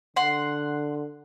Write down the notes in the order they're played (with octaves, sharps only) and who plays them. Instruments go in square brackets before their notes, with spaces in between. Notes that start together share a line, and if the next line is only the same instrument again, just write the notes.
[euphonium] D3 [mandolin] F#5 C6